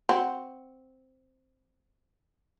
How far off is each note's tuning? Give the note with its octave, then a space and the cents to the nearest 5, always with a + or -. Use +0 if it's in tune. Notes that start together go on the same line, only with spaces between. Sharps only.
C4 +0 F#4 +0